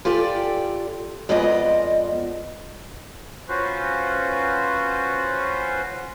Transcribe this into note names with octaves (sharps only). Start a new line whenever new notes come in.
F4 G4 A4 D5 G5
F2 G#3 B3 F4 D5 D#5
C#4 F4 F#4 B4 C5